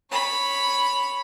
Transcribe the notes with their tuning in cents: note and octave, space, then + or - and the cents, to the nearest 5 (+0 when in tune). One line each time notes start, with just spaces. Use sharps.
C#5 +0 B5 +0